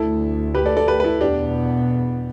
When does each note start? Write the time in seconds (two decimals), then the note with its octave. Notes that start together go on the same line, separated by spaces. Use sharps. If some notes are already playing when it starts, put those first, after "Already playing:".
Already playing: D2 D3 A3 E4 A4
0.55 G4 B4
0.65 A4 D5
0.77 A4 D5
0.88 G4 B4
1.00 B4
1.04 E4 A4
1.21 E2 B2 B3 D4 G4